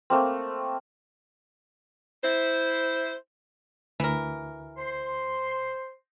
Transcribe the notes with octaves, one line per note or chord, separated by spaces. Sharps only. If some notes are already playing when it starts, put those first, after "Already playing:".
A3 A#3 C4
E4 C5
D2 E3 A#4
C5 C6